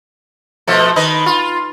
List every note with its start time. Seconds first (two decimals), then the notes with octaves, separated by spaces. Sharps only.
0.67 B2 F3 A3
0.96 D#3 B4 D#5
1.26 F4